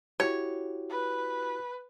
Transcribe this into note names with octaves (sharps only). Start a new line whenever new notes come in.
E4 F#4 G4 C#5
B4